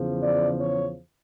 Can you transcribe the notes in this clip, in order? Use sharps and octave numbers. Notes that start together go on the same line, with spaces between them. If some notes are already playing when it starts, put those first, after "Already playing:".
Already playing: E2 C#3 F3
D5
C#5